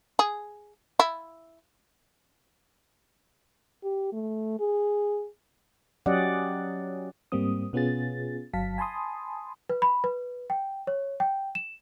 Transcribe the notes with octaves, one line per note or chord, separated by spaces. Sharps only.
G#4
E4
G4
A3
G#4
F#3 C#4 G4 D5 D#5 F#5
G#2 G3 A#3 C4 D#6
B2 B3 C#4 F4 G#4 A6
G1 F#3 F5 A5 B6
G#5 A5 B5 C6 D#6
B4
B5
B4
G5
C#5
G5
E7